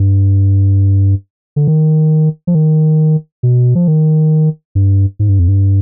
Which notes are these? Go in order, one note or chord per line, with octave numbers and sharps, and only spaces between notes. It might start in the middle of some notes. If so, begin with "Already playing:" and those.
Already playing: G2
D3
D#3
F3
D#3
B2
F3
D#3
G2
G#2
G2
F2
G2